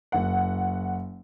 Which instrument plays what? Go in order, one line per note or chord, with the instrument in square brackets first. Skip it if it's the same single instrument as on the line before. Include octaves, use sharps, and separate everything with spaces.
[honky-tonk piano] F#1 F#5